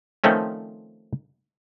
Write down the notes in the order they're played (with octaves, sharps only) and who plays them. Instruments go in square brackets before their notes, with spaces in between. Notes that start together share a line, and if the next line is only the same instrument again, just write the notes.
[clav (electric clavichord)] D#3 F3 A3 C4 C#4